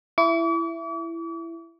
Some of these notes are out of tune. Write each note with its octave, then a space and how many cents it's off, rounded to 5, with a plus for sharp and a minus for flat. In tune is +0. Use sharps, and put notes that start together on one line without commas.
E4 +15 D6 -45